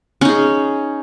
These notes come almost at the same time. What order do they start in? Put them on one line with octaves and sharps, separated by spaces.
C#4 D#4 G#4